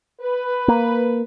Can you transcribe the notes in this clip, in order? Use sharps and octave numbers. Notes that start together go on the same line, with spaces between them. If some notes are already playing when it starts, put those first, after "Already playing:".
B4
A#3